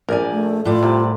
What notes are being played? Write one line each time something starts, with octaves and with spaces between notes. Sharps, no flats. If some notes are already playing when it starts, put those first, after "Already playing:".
A#1 A#4 D5 G#5
A3
A2 F4 D5
C2 C3